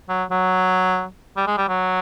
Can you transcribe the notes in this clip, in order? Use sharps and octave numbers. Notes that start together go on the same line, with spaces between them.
F#3
F#3
G3
G#3
G3
F#3